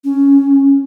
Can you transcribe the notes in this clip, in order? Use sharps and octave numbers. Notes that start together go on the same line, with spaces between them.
C#4